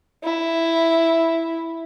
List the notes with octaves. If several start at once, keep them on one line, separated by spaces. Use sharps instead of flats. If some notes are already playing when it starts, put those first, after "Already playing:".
E4